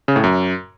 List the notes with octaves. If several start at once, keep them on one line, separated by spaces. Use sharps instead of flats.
C#3
A2
F#2